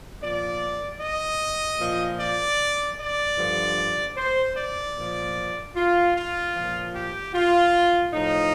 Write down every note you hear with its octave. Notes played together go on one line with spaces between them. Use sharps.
A#2 F3 D5
D#5
A#2 F3
D5
D5
G2 D3 F3
C5
D5
A#2 F3
F4
F4
A#2 F3
G4
F4
A2 F3 D#4